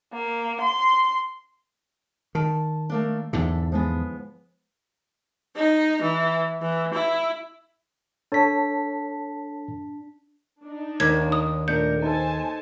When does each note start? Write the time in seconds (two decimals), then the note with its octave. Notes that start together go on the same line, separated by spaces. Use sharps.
0.12 A#3
0.60 C6
2.35 D#3 A5
2.90 A3 A#3 D4
3.33 E2 G#2 D3 A4 E5
3.72 F3 G#3 B3
5.56 D#4
6.02 E3
6.61 E3
6.93 E4
8.32 D4 A4 C#5 A5 B6
10.63 D4 D#4
11.00 D#2 G#6
11.32 D#6
11.68 A#2 A3 D4 A#4 G6 C#7
12.02 D#4 A4 C5 G#5 A5